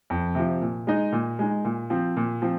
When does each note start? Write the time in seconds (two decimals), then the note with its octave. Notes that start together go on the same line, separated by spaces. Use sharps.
0.10 F2
0.35 C3 F3
0.61 A#2
0.87 G#3 D#4
1.12 A#2
1.39 G#3 D#4
1.65 A#2
1.90 F3 C4
2.17 A#2
2.42 F3 C4